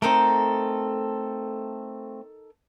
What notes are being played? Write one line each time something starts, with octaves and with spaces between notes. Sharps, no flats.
A3 C4 D#4 A4 A#4